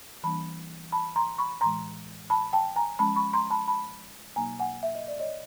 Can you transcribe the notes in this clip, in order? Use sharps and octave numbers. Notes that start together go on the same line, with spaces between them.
E3 G3 A#3 D4 A5 B5
A5 B5
A#5 C6
B5 C#6
A2 E3 G#3 A#5 C6
A5 B5
G5 A5
G#5 A#5
F3 G#3 C#4 A5 B5
B5 C#6
A#5 C6
A5 B5
A5 B5
B2 F#3 A#3 D#4 G#5 A#5
F#5 G#5
E5
D#5
D5
C#5 D#5